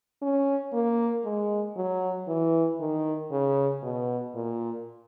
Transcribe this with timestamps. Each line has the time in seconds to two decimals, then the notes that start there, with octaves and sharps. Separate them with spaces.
0.22 C#4
0.73 A#3
1.24 G#3
1.76 F#3
2.28 E3
2.80 D#3
3.31 C#3
3.83 B2
4.35 A#2